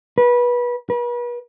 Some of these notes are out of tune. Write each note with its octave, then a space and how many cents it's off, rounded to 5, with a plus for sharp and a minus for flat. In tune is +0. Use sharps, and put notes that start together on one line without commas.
B4 -25
B4 -40